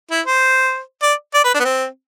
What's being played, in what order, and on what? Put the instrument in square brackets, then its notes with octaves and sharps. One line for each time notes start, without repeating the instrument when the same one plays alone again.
[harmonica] E4
C5
D5
D5
B4
D4
B3
C4